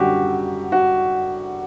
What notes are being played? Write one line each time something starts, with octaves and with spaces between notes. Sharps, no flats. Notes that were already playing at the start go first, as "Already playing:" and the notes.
Already playing: F#2 D3 G3 F#4 G4
F#4